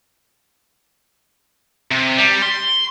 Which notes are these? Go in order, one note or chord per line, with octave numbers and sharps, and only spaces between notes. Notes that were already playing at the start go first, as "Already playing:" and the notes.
C3
G3
C6